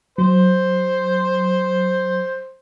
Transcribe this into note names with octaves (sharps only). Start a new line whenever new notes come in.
F#3 C5